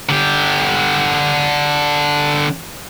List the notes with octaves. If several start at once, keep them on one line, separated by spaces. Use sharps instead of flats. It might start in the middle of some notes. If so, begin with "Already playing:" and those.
D3 G4